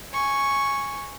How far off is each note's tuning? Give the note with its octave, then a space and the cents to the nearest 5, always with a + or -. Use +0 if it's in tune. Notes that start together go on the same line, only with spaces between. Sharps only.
G#5 +0 C#6 +0